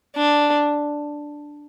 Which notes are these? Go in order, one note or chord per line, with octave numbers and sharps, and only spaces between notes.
D4